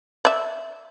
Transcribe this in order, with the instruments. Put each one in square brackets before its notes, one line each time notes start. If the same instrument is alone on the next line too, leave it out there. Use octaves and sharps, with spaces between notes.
[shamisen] D5 E5